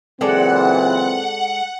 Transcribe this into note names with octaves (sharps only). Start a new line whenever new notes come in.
F#1 A#2 E3 G#3 C4 A4 D5 F#5